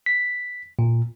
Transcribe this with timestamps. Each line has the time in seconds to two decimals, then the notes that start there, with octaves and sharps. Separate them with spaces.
0.06 B6
0.79 A#2